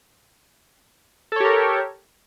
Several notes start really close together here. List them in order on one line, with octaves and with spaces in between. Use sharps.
A4 C#5 G4 A#4